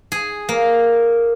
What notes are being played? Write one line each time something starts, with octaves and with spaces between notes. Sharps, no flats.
G#4
A#3